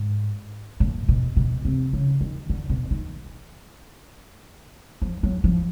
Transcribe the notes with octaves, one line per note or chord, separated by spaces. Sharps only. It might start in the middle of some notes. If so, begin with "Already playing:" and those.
Already playing: G#2
A#2
B2
B2
C3
C#3
D#3
D3
B2
D#3
F3
F#3
F3